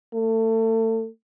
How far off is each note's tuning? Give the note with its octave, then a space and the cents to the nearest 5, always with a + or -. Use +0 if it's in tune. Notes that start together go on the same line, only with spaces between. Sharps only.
A3 +30